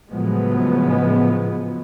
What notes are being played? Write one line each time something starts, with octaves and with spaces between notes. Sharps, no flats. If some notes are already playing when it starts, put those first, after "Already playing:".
A2 C#3 F3 F#3 G#3 B3